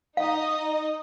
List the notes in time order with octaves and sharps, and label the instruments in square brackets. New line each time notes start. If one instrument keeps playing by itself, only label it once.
[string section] D#4 D#5 [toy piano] F5